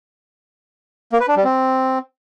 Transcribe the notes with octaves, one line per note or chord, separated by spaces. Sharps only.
A#3
B4
D4
G3
C4